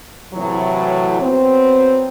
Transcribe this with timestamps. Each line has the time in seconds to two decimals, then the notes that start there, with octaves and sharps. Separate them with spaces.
0.34 A2 C3 E3 F#3
1.20 F#3 B3 C4